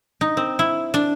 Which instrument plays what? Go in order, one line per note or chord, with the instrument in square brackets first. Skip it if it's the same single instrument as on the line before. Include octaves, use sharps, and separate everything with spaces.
[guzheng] D#4
C4
E4
D4